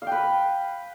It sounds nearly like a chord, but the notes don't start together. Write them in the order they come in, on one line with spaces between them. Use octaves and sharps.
F5 G5 B4